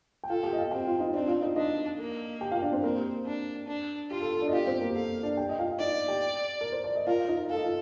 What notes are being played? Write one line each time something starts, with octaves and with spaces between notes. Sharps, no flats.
G5
F4 A4 F5
G4 G5
D#5
F4 F5
C4 G4 G5
F4 F5
D#4 D#5
C4 D4 D5
F4 F5
D#4 D#5
D4 D#4 D#5
A#3
G4 G5
F4 F5
D4 D5
C4 C5
A#3 C4 A#4
G4
D4
D4
F4 G4
A4
A4
D4 D5
D#5
F4 G4 F5
C4 C5
A#3 A#4
G4
A4 F5
D4 D5
G4 G5
D#5
F4 F5
D#4 D5 D#5
G4 G5
A#4
C5
D5
D#5
F4 A#4 F5
D#4 D#5
A4 F5
D#5
F4 F5